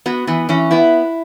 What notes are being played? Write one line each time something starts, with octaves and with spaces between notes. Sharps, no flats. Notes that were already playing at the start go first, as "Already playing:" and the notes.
B3 F#4
E3 B3
E3 C#4
B3 E4